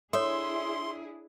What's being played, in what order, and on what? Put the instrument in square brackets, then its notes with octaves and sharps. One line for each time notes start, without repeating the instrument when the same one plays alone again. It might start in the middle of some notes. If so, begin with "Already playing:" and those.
[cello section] D4 E4 G#4 [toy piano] A4 C#5 [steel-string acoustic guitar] E5 [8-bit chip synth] C6